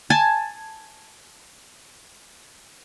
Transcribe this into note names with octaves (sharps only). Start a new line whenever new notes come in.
G#5 A5